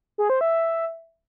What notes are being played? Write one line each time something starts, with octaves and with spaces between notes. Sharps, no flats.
G#4
C5
E5